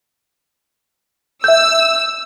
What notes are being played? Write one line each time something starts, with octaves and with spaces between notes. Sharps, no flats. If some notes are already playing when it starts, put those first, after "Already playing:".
E5 E6 G6